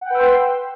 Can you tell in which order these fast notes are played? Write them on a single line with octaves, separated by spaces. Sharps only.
F#5 G5 B4 E6 C6